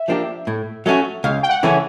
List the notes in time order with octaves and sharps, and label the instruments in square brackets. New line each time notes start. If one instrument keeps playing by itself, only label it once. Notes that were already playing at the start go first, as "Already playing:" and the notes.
Already playing: [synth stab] E5
[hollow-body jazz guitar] F3 A#3 D4 G4
A2
F#3 A3 C#4 F#4
[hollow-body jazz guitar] C#2 [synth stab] F5
[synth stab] G5
F#5
[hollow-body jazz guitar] C#3 E3 A3 C#4